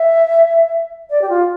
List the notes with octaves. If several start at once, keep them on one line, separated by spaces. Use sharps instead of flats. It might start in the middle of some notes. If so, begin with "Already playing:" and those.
Already playing: E5
D5
G4
F4